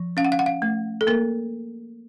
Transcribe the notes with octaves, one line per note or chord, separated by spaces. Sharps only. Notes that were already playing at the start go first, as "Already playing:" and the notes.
Already playing: F3
C#4 F5
F#5
F5
F#5
F5
A3
A4
A#3 A#4